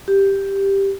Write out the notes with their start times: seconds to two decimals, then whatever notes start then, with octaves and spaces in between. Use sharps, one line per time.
0.08 G4